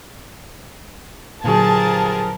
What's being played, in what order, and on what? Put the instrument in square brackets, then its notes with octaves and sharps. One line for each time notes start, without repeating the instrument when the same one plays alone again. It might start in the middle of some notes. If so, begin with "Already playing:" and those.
[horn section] G2 F3 A#4 [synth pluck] A#2 D3 F#3 [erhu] G#4 [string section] A5